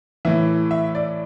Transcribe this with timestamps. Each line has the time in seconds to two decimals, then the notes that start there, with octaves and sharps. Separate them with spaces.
0.25 A2 E3 E5
0.71 E5
0.95 D5